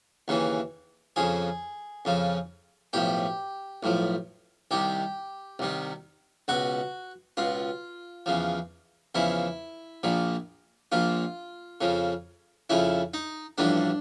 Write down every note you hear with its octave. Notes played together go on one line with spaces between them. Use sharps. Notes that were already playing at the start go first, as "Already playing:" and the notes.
D#2 C#3 E3
F2 C#3 F3 G#4
F2 C#3 F3
B1 A2 F3 G4
B1 A2 F3
C2 C3 D#3 G4
C2 C3 D#3
C#2 B2 F#4
C#2 B2 F4
E2 C#3 F3
E2 C#3 F3 E4
A#1 A#2 F3
A#1 A#2 F3 F4
F2 C#3 F3
F2 C#3 F3 E4
D#4
A1 G2 D3 F3 D4